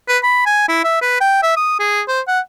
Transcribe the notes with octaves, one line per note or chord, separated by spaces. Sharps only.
B4
B5
G#5
E4
E5
B4
G5
E5
D#6
G#4
C5
F#5